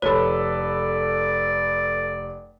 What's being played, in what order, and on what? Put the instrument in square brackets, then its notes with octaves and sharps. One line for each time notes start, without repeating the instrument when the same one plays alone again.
[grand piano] F1 B5 [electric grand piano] A4 B4 [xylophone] C#5 [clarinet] D5